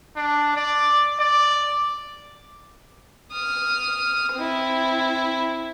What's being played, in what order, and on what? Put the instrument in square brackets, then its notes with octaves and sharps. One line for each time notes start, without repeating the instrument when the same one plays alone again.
[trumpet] D4
D5
D5
[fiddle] D#6 F6
C4 E4